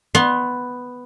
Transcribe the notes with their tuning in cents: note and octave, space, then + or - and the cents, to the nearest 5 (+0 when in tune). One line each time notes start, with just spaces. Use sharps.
B3 +5 C6 +25